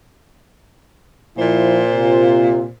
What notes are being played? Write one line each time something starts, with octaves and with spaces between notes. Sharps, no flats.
A#2 F3 E4 C5
C3 F4